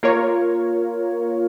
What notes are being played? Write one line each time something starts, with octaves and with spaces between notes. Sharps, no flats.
A#3 F4 A#4 C#5